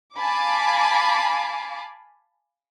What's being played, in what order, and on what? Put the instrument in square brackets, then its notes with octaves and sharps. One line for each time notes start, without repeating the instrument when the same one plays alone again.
[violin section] F5 G#5 A5 B5 D6